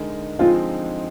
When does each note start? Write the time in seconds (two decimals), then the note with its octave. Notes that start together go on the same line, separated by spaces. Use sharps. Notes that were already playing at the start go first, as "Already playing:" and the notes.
Already playing: D3 G#3 D#4 A#4
0.39 D3 F3 G#3 C4 D#4 F4